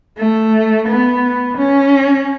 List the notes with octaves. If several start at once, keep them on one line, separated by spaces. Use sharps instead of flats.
A3
B3
C#4